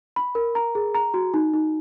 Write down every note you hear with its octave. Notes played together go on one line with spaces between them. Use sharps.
B5
A#4
A#5
G#4
A#5
F#4
D#4
D#4